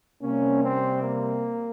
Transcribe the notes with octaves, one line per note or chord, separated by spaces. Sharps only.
C3 G3 A#3 C#4
C4
A#3